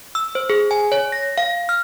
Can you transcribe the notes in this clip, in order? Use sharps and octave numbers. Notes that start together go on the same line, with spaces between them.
E6
C5
G#4
G#5
C#5
A#6
F5
F6